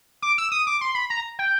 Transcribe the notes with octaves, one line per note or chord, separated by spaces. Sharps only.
D6
E6
D#6
D6
C6
B5
A#5
G5